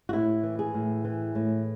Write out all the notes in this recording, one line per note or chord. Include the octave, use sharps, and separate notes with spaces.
F#4
A2 E4
E3
G#4
A2
E3
A2